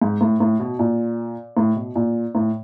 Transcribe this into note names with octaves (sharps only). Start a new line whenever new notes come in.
G#2
A2
A2
B2
A#2
A2
B2
A#2
A2